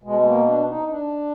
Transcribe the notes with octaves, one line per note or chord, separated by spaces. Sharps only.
B2 G#3
G#3
A#3
D4
D#4
D4